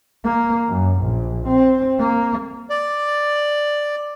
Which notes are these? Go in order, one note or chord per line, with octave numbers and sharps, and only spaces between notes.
A#3
F#2
A#1
C4
A#3
D5